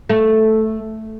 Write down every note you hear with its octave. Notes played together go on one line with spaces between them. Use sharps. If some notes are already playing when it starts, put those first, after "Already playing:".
A3